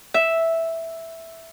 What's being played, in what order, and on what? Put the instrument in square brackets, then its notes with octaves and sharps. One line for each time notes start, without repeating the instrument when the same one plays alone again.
[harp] E5